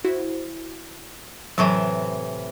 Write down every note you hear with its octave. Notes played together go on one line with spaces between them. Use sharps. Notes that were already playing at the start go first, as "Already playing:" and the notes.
E4 F#4 C5
A2 C3 E3 F#3 C#6